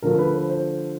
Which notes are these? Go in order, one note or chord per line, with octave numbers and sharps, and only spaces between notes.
D3 F3 A3 A#4
B4
C5
C5